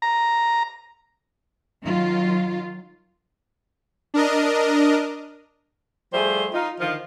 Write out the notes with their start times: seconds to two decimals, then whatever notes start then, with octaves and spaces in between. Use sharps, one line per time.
0.02 A#5
1.82 D#3 F#3 F4
4.14 D4 A#4 D#5
6.14 F3 G3 A3 G#4 C5
6.54 D#4 F4
6.79 D3 D#3 F3 F4